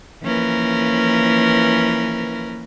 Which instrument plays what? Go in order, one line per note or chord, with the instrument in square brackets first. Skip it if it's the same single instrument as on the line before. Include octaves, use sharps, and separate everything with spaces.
[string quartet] E3 F3 A#3 C#4 A#4 B4